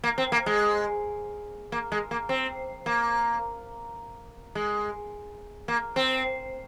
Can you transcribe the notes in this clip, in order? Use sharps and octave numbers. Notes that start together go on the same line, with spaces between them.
A#3
C4
A#3
G#3
A#3
G#3
A#3
C4
A#3
G#3
A#3
C4